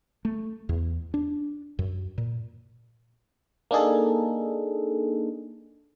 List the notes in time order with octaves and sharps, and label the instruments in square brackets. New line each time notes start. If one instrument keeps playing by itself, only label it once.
[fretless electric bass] A3
E2
D4
F#2
A#2
[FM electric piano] A#3 D4 D#4 G#4 A4